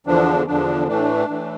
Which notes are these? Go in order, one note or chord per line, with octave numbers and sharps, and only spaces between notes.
E2 D3 F3 D4
E2 D3 F3 D4
A2 E3 A3 D4
A2 E3 A3